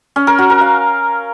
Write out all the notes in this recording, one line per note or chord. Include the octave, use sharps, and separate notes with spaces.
C#4
A#4
F#4
A#4
F5